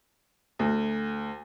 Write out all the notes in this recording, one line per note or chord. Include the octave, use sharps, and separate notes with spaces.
D2